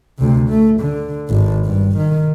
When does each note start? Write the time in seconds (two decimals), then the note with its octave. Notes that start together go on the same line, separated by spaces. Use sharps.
0.19 D2 C3
0.49 A3
0.81 D3
1.29 G#1
1.65 G2
1.97 D#3